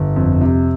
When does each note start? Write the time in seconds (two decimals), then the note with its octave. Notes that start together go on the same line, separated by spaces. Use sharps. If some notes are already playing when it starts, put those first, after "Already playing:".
Already playing: G1
0.16 F2
0.41 C3